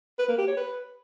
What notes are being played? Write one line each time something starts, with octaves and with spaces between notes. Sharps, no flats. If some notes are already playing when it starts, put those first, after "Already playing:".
B4
A#3
G4
C#5
B4